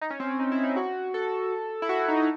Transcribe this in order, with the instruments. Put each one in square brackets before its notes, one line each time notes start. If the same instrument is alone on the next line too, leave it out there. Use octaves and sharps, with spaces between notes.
[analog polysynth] D#4
C#4
C4
C#4
D#4
E4
D#4
F#4
A4
E4
F#4
D#4
D#4